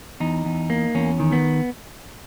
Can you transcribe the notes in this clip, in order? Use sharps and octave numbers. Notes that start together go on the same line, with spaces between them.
E2 D#4
E2
A#3
E2 C#4
D#3
B3